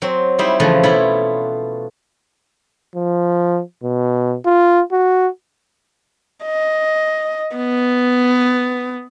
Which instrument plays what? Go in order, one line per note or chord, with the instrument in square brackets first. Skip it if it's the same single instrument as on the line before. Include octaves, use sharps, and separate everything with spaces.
[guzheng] F#3 C4
G3 D#4 E4 C5 E5
C#3 E3 F3 A3 B4
B2 E4 F4 C#5 B5
[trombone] F3
B2
F4
F#4
[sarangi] D#5
B3